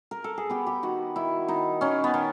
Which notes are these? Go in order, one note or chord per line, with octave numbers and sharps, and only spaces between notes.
A#4
A4
G#4
B3 G4
G4
D#3 F#4
D#3 E4
D#3 D#4
D#3 C#4
B3
D#3